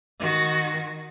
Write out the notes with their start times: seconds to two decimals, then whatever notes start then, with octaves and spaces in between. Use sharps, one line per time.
0.19 D#3 F#4